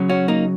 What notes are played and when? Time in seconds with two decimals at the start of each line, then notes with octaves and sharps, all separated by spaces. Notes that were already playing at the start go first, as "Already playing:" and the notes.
Already playing: F#2 C#3 F#3
0.09 C#4 F#4
0.28 A#3 D#4